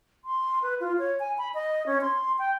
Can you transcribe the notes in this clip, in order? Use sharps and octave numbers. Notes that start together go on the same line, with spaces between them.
C6
B4
F4
C#5
G#5
B5
D#5
C#4
C6
G5